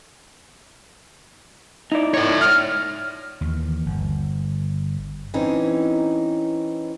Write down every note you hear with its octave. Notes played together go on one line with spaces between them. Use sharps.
D#4 E4 D5
C#5 E5
F6
D#2 E3
G1
E3 C4 C#4 D#4